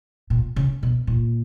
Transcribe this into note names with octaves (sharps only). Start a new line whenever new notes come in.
A#2
C#3
B2
A#2